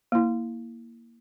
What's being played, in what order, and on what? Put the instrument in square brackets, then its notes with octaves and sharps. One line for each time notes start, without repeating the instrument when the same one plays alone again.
[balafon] A#3 E4